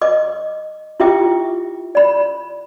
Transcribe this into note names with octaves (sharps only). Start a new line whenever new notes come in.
D#5 D6
E4 F4 G4 E5 G5 D6
D5 B5